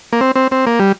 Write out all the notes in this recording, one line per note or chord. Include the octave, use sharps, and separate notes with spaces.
A#3
C4
C4
C4
A#3
G3